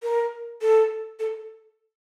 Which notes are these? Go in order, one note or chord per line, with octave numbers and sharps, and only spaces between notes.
A#4
A4
A4